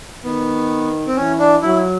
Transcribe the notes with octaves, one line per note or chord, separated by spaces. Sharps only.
D#3 B3
C4
E3 C#4
D4
F#3 E4